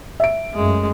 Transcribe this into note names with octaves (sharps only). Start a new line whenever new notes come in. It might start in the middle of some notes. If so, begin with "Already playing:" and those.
E5 D7
F#2 G#3 A3